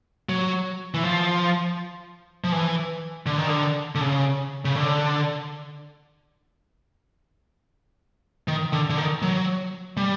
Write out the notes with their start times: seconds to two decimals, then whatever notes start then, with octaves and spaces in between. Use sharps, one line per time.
0.29 F#3
0.94 E3
1.04 F3
2.44 F3
2.52 E3
3.26 D3
3.38 D#3
3.49 D3
3.95 D3
4.01 C#3
4.65 C#3
4.75 D3
8.48 D#3
8.73 D3
8.90 D3
8.97 D#3
9.22 F#3
9.97 G3